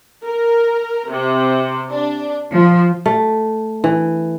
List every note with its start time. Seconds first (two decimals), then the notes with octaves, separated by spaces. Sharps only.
0.25 A#4
1.10 C3
1.91 D4
2.53 F3
3.06 A3
3.84 E3